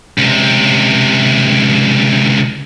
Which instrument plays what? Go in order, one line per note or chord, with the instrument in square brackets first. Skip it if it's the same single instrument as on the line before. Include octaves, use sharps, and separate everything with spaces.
[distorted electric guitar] C#2 C3